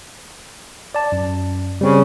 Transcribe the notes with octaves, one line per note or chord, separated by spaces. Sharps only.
D5 A5
F#2
C#3 G3 C4